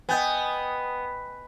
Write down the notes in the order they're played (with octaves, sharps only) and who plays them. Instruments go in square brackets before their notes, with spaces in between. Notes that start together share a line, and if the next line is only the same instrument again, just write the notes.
[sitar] B3 [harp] D#5 G5 G#5